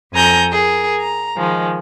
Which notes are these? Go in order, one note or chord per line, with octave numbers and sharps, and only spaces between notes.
F2 A4 G#5 A#5 G6 A#6
G#4 A#4
A#5
D#3 F3 G#3